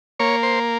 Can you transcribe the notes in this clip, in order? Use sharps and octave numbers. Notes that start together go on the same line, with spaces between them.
A#3 C#5
C5